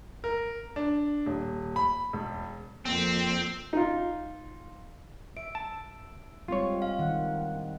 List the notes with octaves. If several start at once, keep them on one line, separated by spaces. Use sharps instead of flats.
A#4
D4
D#1
B5
E1
F2 A#3 C4
D#4 F4
E5 D7
A5
G3 G#3 C4 F4 C#5
F5
D#3 F#5